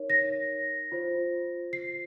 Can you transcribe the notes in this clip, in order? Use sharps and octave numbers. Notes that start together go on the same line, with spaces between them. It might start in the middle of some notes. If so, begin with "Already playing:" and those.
Already playing: D#4 A#4 C#5
A#6
F4 C5
C7